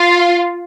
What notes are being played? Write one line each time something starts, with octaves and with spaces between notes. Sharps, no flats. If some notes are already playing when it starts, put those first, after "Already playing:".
Already playing: F4